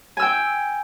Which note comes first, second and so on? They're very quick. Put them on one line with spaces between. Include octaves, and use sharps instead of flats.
G#5 E6 G5